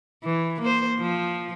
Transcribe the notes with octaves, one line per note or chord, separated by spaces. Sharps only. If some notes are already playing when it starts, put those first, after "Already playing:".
E3
A#3 C5
F3